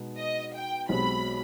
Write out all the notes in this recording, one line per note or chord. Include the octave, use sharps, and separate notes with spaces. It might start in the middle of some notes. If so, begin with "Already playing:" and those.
Already playing: B2 G#3 B3 D#4
D#5
G5
B1 B2 G#3 C4 G4 B5